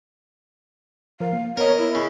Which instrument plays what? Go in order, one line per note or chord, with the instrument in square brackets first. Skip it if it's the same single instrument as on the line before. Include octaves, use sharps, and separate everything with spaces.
[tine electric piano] F3 A#4 [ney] F5
[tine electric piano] A#3
[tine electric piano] B3 A#5 [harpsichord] A#4 D#5 [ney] C#5
[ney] E4
[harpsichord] C#3